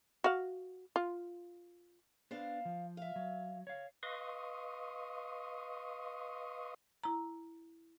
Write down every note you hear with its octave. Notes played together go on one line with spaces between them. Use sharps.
F#4 F5
F4
B3 D4 C5 F5
F3
E5 F5
F#3
C#5 F5
B4 D#5 F5 C6 C#6 D#6
E4 A#5